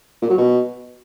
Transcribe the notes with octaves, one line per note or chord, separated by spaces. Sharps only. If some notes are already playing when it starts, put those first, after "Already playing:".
A#2
F#3
B2